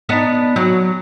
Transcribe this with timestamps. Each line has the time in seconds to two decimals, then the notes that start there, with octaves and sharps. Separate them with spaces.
0.09 B3 D4 D#4
0.56 F#3